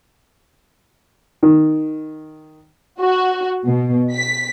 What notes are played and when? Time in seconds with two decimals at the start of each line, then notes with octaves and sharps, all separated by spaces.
1.43 D#3
3.00 F#4
3.66 B2
4.12 B6